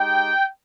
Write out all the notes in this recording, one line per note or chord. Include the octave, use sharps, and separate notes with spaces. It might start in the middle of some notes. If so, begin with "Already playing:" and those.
Already playing: G#3 D#4 G4 G5